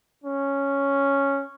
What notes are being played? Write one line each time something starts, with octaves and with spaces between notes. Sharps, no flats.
C#4